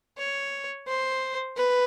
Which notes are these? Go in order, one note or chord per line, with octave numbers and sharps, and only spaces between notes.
C#5
C5
B4